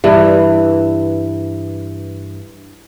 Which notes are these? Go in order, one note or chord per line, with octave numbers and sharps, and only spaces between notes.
G2 E3